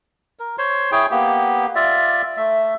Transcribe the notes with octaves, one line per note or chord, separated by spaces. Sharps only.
A#4
C5 C#5 C6
E4 G#4 C#5 G5
A#3 B3 G4
F4 D5 E5
A3 E5